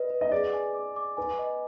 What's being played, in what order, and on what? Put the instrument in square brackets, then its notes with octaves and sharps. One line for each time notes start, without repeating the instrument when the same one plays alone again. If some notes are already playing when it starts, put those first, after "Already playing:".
Already playing: [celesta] B4 D5 [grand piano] D#5
[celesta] B4
[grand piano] D#5
[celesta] G#4 [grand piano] D5
[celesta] G#5
D6
D6
[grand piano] B4 [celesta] G#5
[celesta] D#5